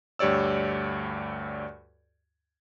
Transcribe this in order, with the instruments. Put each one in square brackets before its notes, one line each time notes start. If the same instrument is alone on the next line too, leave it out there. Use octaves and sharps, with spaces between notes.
[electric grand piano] D2 G2 G4 C#5 D5 E6